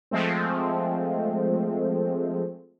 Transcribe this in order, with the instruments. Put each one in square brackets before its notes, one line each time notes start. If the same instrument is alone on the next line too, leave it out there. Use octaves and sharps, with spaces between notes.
[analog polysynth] F3 G#3 A3 C4